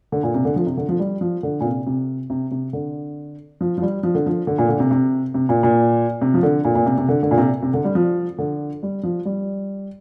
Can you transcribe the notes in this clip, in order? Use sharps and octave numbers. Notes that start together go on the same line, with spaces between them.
D3
A#2
C3
D3
F3
C3
D3
F3
G3
F3
D3
A#2
C3
C3
C3
C3
D3
F3
F3
G3
F3
D3
F3
D3
A#2
D3
C3
C3
C3
A#2
A#2
C3
F3
D3
A#2
A#2
C3
C3
D3
D3
A#2
C3
C3
D3
G3
F3
D3
G3
F3
G3